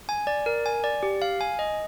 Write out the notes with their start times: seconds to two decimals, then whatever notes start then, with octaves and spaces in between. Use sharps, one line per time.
0.09 G#5
0.27 D5
0.46 A#4
0.66 G#5
0.84 D5
1.03 G4
1.22 F5
1.41 G#5
1.59 D#5